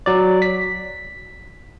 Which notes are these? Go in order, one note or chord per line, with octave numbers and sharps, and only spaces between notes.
F#3 D5
B6